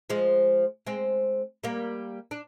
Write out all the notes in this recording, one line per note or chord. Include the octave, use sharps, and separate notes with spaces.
F3 G#3
G#3 C4
G3 A#3
D4